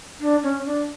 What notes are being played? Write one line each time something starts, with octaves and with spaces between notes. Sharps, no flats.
D4
C#4
D4